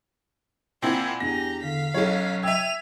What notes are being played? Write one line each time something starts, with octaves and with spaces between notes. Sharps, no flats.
A#2 C4 E4 F#5 G#5
E2 D4 G4 A#5 A#6
D3 F5 B6
B1 F#3 C#4 F#4 A4 C#5
E5 G5 E6 G#6 D#7 F7